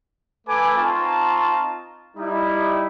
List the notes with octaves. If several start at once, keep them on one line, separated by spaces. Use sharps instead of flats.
A3 A4 B4 G#5 D6
C4 D#4 F4 A5 A#5 C#6
G3 D#4 E4